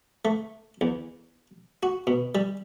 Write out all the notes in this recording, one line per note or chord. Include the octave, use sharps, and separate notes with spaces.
A3
E2
F#4
B2
G3